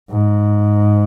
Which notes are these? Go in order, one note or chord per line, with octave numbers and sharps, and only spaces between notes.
G#2